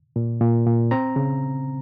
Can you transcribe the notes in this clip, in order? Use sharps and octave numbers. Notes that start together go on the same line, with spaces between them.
A#2
A#2
A#2
C4 A#5
C#3